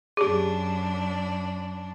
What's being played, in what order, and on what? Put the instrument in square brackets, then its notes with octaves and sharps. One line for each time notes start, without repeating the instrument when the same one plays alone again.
[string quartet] F#2 D4 [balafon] G4 G#4